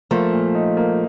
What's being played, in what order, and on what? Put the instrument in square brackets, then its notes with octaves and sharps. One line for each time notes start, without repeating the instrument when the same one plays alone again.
[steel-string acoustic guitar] F3 A3 [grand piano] A#3
[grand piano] A#2
D#4
A#3